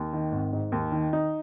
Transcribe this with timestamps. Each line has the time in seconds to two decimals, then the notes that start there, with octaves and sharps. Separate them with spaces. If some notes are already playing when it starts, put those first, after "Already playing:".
Already playing: D#2
0.13 D#3
0.32 G#1
0.53 G#2
0.72 D#2
0.92 D#3
1.13 D#4